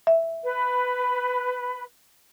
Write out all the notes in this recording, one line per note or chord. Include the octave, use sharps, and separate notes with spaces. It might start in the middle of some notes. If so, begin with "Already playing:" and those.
E5
B4